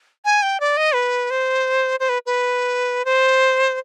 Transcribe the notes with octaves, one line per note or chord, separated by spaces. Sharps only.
G#5
G5
D5
D#5
B4
C5
C5
B4
B4
C5